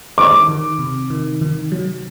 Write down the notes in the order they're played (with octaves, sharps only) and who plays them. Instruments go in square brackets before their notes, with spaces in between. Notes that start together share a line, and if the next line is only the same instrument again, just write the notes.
[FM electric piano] D#3 [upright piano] D6
[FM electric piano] D#3
C3
D#3
D#3
F#3